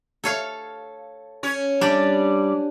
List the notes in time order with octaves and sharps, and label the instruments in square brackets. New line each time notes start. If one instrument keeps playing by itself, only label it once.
[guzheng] A4 C#5 F5
[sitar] C#4 C#5
[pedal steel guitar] G3 D5 [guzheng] D4 G4